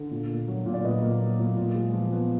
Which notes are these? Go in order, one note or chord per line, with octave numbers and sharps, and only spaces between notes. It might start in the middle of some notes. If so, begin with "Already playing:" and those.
Already playing: D3
A#2
A#3
F#3
A#2
D5
A#2 B4 D#5
A#3
F#3
A#2
A#2
G#3
F3
B3